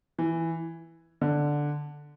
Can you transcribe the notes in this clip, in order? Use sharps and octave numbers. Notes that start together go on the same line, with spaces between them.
E3
D3